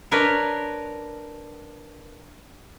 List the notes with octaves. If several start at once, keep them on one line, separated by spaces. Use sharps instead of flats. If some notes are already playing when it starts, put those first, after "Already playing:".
D4 A#4 B4 C#5